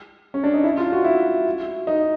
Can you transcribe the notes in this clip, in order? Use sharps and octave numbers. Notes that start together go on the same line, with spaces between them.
C#4
D4
D#4
E4
F4
F#4
E4
D#4